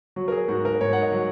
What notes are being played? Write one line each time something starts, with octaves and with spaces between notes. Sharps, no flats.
F#3 F#4
A#4
G#4
G#2 F#4
A#4
G#2 C#5
F#5
D#5
F#3